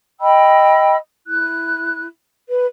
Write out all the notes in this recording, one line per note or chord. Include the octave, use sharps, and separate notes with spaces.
D#5 G5 B5 E6
E4 F#6
B4